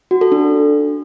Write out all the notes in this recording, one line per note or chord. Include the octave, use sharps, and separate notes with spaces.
F#4
A4
D4